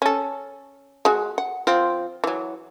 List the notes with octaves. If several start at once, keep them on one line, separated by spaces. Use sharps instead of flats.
C#4 A4
G#3 F#4
F#5
F3 C4 F4
E3 F#3